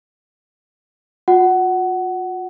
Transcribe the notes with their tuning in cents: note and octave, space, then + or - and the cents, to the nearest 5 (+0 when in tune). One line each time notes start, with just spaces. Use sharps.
F4 +45 F#5 +15